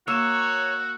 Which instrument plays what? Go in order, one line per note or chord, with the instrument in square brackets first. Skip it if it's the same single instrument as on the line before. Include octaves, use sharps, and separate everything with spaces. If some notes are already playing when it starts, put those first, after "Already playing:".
[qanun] A#3 [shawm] F#4 [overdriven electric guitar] C#5 [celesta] E6 E7